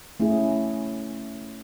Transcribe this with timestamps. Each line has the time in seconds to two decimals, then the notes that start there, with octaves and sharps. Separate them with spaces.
0.20 A3 C#4 E4 G#4